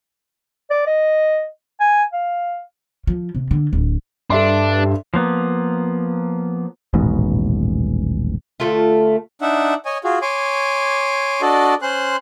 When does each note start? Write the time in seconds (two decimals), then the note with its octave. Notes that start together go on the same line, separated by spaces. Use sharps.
0.70 D5
0.87 D#5
1.80 G#5
2.13 F5
3.07 F3
3.35 C3
3.51 D3
3.73 D1
4.30 G2 D4 A4 E5 C6
5.14 F3 A#3 B3
6.94 D#1 A1 G#2 B2
8.60 D2 A3 F4
9.42 D4 D#4 E5 F#5
9.85 C#5 D#5 G#5
10.04 F4 F#4 G#4
10.22 C#5 G#5 C6 D6
11.42 D4 F#4 A4 D5 D#5
11.82 C#4 C5 C6 F#6